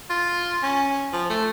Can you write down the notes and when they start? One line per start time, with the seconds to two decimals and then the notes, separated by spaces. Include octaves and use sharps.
0.10 F4
0.63 C#4
1.13 F3
1.30 A3